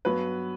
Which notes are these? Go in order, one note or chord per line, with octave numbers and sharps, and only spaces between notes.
G2 F#3 B3 B4